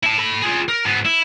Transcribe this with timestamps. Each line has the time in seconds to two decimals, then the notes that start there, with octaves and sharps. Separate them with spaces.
0.03 E4 A5
0.18 A4 B5
0.42 F4 G#4
0.68 A#4
0.86 G#2 B3
1.05 E4